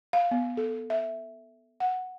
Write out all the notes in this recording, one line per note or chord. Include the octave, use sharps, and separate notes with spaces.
F5
B3
A4
E5
F#5